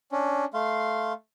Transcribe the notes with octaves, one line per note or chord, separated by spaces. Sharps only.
C#4 D4
A3 F5 C6